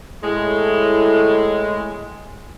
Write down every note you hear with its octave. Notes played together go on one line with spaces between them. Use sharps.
A2 G#3